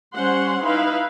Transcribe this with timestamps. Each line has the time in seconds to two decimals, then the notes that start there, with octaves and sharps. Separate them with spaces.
0.13 G3 C#4 C5 F#5 C6
0.64 D#4 E4 B4 F5